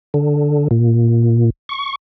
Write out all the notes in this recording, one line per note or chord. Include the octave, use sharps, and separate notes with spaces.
D3
A#2
C#6